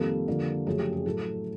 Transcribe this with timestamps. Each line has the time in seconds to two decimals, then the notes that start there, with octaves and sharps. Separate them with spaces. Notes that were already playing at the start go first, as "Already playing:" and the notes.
Already playing: F2 C3 D#3 G3 A#3 A4
0.28 F2 D3 G3 A#3
0.67 F#2 C#3 F3 A3 G#4
0.79 G4
0.93 G#4
1.06 A2 F#3 A3 A4